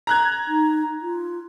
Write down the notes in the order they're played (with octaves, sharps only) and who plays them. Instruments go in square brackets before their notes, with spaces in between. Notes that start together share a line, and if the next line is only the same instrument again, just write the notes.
[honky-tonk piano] A#5 F#6 G#6
[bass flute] D#4
F4